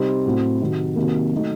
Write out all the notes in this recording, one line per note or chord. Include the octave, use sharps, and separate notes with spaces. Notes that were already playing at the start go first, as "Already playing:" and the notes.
Already playing: C3 G3 C4 D#4
A2 F#3 C4
C3 D#3 F#3
C3 D#3 F#3 A#3
F#3 A3 D#4